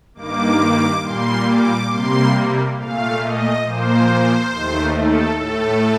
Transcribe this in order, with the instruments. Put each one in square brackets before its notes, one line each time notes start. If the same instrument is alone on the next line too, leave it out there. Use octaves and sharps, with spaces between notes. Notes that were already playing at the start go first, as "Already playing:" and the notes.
[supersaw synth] G2 D#3 A#3 D6
A#2 G3 A#3 C6
D6
C3 G3 A#3 C6
A#2 A3 F5
D#5
A#2 F3 A#3 C5
D#2 D#3 A3
A4
A2 A3 A4